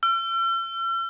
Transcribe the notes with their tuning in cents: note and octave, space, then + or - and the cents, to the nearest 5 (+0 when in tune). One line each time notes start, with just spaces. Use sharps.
E6 +45